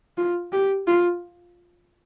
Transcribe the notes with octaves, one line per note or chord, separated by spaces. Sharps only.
F4
G4
F4